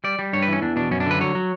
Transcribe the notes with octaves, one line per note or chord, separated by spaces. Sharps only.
G3 D5
G3
G2 C#5
B4
E3 C#4
E2 D4
B2 D4
F#2 C#4
D4
D3 B4
F#3 C#5
F#3